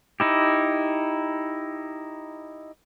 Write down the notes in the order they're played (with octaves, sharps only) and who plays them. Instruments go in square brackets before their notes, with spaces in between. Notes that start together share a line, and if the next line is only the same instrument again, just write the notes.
[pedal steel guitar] D#4 E4 G4